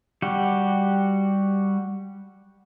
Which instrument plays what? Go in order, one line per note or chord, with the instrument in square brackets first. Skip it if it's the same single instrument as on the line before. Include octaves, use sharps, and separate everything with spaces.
[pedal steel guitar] G3 F#4 G4